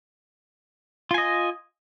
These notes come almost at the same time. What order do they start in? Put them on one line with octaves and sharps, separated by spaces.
F4 G#5 D#5